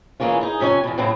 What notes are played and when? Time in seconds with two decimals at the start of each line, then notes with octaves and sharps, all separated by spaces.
0.20 E3 G#3 A#3 C#4 F4
0.41 D#4 G#4
0.60 F2 C3 C#4 C#5 G#5
0.84 E2 B2
0.98 A2 C#3 F#3 C4 E4